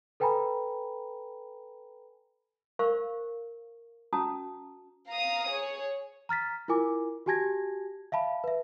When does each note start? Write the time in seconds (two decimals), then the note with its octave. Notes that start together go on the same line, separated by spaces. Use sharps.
0.20 A4 B4 G5 G#5 A#5 B5
2.79 A#4 C5 F5 C#6
4.13 C#4 F#4 A5 A#5 D#6
5.10 F5 A#5 D#6
5.49 G#4 C#5
6.29 A#5 F6 A6 B6
6.68 E4 F4 A#4 G#5 D6
7.26 F#4 G4 G#5 A5 G#6 A#6
8.12 E5 F5 A5 B5
8.44 B4 E5